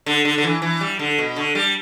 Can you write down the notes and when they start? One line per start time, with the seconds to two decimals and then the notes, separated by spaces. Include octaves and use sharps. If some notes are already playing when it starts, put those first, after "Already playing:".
0.06 D3
0.25 D3
0.38 D3
0.43 E3
0.62 E3
0.81 G3
0.99 D3
1.18 B2
1.36 D3
1.55 G3